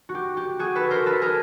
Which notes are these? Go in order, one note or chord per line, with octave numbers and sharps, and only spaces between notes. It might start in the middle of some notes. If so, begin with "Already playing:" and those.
F#4
G4
G4
F#4 G#4
A4 B4
A#4 C5
A4 B4
G#4 A#4